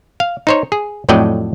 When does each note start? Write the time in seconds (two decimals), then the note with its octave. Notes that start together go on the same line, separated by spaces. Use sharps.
0.20 F5
0.47 D#4 C5 C#5
0.72 G#4
1.09 F2 A2 F#3 D5 D#5 G5